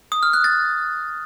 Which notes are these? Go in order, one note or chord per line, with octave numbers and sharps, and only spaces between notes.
D#6
F6
F#6
A6